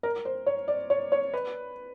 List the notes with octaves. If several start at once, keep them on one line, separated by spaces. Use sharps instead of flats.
A#4
C5
C#5
D5
C#5
C#5
B4